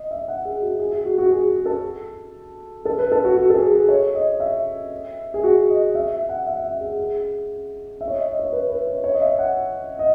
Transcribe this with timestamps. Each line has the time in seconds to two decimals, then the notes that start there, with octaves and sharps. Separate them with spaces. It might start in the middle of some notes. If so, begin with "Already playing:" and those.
Already playing: D#5
0.11 E5
0.28 F#5
0.45 G#4
0.62 F#4
0.79 G#4
0.93 G#4
1.05 F#4
1.18 F#4
1.31 G#4
1.48 G#4
1.66 A4
2.85 A4
2.99 B4
3.12 A4
3.25 F#4
3.37 F#4
3.50 A4
3.55 G#4
3.71 G#4
3.89 C#5
4.15 D#5
4.40 E5
5.34 G#4
5.44 F#4
5.69 D#5
5.95 E5
6.12 E5
6.29 F#5
6.46 E5
6.64 E5
6.81 G#4
6.98 G#4
8.01 E5
8.08 C#5
8.14 D#5
8.27 D#5
8.39 C#5
8.53 B4
8.70 B4
8.87 C#5
9.04 C#5
9.14 D#5
9.21 E5
9.39 F#5
9.99 D#5